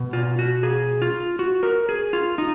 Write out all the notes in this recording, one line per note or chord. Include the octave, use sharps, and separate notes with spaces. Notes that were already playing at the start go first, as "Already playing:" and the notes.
Already playing: B2
F4
F#4
G#4
F4
F#4
A#4
G#4
F4
D#4